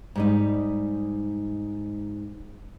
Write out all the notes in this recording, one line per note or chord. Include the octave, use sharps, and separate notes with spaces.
G#2 G3 D#4